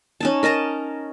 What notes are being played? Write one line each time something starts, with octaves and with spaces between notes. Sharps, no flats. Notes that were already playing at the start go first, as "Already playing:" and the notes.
C#4 D#4 A5
A#4 D#5 A5 A#5